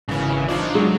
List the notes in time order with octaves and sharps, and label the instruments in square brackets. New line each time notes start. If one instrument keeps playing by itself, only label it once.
[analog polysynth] G#1 E3 [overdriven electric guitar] C#3
[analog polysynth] D4 D#4 F4 [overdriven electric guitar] C5 D5
[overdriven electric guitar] F#3 [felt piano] G#3